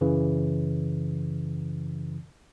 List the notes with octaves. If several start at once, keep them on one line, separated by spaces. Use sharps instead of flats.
F#2 C#3 E3